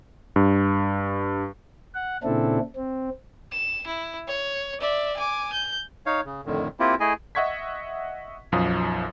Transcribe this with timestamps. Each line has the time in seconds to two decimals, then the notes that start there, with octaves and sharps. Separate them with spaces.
0.36 G2
1.95 F#5
2.23 A#2 C#3 C4 D4 E4 A4
2.76 C4
3.52 E7
3.87 E4
4.27 C#5
4.80 D5 E5
5.17 G#5 D6
5.53 G6
6.06 D#4 C#5 F5
6.25 C#3
6.46 F2 A2 D3 D#3
6.80 A#3 C4 E4 F4 G4
7.00 A3 E4 G#4 D#5 G#5
7.35 D#5 E5 F#5 C#6 G#6 B6
8.52 B1 F#2 F3 F5 D#6